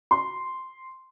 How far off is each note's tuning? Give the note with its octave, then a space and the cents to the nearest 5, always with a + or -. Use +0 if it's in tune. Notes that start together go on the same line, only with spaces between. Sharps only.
C6 -5